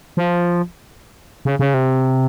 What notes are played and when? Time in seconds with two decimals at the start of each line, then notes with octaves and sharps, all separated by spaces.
0.17 F3
1.45 C#3
1.59 C#3
1.74 C3